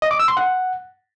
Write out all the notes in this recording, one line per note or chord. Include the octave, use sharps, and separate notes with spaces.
D#5
D6
E6
C6
F#5